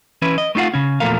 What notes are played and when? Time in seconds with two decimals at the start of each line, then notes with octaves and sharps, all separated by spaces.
0.22 E3 C#4 E4 B4
0.38 D#5
0.55 A3 D#4 F4 F5 F#5
0.74 C#3 C#4
1.00 E2 A#2 F3 A3 A#4 F5